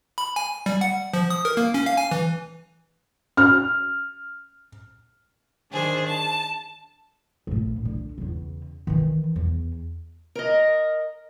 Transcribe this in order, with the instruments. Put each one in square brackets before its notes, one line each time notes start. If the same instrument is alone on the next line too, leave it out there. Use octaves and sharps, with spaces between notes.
[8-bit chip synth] B5
G#5
G3
F#5
F3
D#6
A#4
A#3
C#4
F5
G#5
E3
[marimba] C#4 [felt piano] F6
[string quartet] D#3 D4 G#4 C5
A5
[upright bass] A#1 A2
D3
E2 C#3
D#3 E3
E2
[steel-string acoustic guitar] A#4 D#5